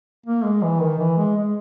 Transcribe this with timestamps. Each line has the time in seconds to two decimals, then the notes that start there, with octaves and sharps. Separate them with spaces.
0.26 A#3
0.44 G#3
0.62 E3
0.81 D#3
0.99 E3
1.18 G#3
1.37 G#3